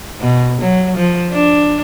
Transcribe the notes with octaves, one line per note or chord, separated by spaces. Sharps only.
B2
F#3
F3
D4